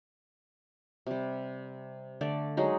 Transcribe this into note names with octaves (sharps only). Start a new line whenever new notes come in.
C3 G3
D3 A3 D5
F#3 G#3 D#4